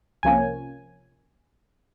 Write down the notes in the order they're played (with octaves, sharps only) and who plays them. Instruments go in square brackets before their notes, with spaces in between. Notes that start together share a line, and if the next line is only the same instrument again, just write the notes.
[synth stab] C2 C3 F3 A#3 C#4 G#5